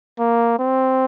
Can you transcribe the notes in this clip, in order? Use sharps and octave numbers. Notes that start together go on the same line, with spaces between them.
A#3
C4